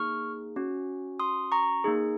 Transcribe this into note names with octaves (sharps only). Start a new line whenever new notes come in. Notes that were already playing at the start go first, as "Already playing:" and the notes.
Already playing: A#3 D#4 G#4 C#6 F6
C#4 F#4
C6 D#6
A#5 C#6
A#3 D#4 G#4